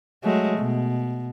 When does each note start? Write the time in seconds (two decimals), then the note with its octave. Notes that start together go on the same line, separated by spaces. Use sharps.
0.24 F#3 G#3 A3
0.59 B2